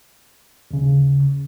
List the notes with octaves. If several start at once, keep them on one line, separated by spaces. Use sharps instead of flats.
D#2 C#3